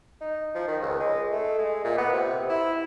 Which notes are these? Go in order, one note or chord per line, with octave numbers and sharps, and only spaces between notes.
D#4
F3
D#3
C#2
G#3
A3
G#3
A#2
B3
C3
E4